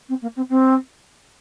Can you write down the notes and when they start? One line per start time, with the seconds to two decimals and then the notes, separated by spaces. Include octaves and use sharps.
0.09 C4
0.22 A#3
0.36 C4
0.49 C4